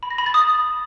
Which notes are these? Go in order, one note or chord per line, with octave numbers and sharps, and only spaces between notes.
B5
A#6
B5
A6
D#6